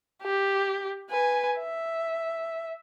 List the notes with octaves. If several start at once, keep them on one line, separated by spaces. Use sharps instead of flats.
G4
B4 G#5
E5